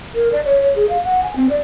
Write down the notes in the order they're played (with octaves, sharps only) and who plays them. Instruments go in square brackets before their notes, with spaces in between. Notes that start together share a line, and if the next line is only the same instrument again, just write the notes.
[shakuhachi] A#4
D5
C#5
C#5
G#4
F5
F#5
G#5
C4
D5